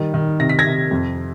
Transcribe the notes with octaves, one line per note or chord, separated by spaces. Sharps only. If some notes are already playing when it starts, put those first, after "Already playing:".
Already playing: D#3 G3
D#3
C3 A#6
B6
G#6 A#6
C3
F2